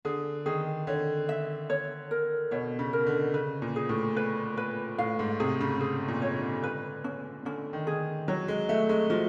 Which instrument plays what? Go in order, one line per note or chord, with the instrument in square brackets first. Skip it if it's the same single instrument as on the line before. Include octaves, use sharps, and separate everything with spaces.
[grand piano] D3 [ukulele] G#4
[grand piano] D#3 [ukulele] G#4
[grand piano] D3 [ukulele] C#5
[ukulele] E5
C#5
A#4
[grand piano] B2 [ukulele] C#5
[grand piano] C#3
[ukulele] A#4
[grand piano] D3
[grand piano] C#3 [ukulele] B4
[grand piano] A#2
[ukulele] G#4
[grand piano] A2
[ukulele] B4
B4
[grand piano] A2 [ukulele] F5
[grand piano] G#2
[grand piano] C3 [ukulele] G#4
[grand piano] C#3
[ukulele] G#4
[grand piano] A#2
[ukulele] C#5
[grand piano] D3
[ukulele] B4
C#4
[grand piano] D3 [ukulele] C#4
[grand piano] D#3
[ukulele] G#4
[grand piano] F#3 [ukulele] C#5
[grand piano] G#3
[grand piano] A3 [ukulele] E5
[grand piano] G#3
[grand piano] F3 [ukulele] F#4